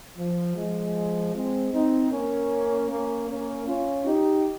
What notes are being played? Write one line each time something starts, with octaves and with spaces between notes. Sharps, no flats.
F3
F3 G#3
G#3 C4
C4 D#4
A#3 C#4
A#3 C#4
A#3 C#4
C#4 F4
D#4 G4